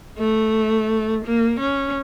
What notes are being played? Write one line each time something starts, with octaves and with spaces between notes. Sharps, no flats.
A3
A#3
C#4